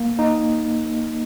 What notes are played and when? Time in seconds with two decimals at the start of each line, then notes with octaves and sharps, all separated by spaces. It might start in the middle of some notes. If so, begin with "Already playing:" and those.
Already playing: A#3
0.19 D#4